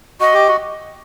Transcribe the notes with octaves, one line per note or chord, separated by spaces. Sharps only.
F#4 D#5
G4
F#4